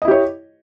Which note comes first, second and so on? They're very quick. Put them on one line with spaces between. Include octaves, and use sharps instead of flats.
D#5 E4 G4 C#5